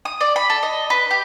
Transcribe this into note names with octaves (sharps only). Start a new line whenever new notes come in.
D#6
D5
B5
A4
D#5
B4
G4